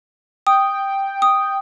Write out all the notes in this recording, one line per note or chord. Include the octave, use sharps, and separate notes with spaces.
G5 D#6
D#6